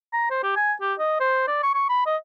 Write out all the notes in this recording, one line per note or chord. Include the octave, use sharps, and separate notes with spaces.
A#5
C5
G4
G#5
G4
D#5
C5
D5
C#6
C#6
B5
D#5